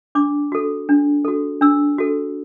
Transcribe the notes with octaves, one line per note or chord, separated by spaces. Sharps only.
D4 D6
F#4 A4
D4
F#4 A4
D4 E6
F#4 A4